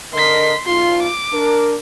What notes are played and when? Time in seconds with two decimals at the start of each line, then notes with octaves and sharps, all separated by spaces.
0.14 D3 A#4 D#5 C6 B6
0.66 B1 F4 C6
1.03 D6
1.33 D4 A#4